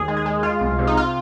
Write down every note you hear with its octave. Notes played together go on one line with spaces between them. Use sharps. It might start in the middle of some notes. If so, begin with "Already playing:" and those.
Already playing: D#2 G#4
G#3
G#4
G#3
G#3 F4
C2
C3
D#4
F4